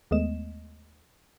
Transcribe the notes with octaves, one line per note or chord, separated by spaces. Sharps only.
D#2 G#3 A3 B3 D#5 E7